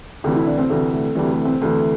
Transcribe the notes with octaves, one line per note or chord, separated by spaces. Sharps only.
D2 C3 E3 G4
E4
D4
C4
D2 C3 E3 A3
A3
D2 C3 E3 G3
A3
C4
D2 C3 E3 A3